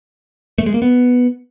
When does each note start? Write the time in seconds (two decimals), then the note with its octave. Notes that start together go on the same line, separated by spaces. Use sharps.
0.58 A3
0.66 G#3
0.74 A#3
0.82 B3